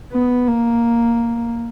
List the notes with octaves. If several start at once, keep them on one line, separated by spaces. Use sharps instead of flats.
B3
A#3